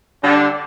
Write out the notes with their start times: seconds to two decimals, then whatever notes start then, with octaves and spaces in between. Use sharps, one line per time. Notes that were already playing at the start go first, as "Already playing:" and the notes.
0.23 D3 G3 D4